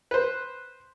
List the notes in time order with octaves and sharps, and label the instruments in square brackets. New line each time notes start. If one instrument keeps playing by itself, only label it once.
[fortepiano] B4 C5